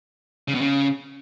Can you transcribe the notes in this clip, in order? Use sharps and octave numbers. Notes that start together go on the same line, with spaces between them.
C#3
B2
C#3